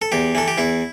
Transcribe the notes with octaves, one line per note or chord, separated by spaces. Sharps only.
A4
E2 G4
E3 A4
G4
E2 E4